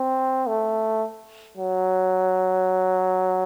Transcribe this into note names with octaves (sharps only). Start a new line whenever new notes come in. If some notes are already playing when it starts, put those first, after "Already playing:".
Already playing: C4
A3
F#3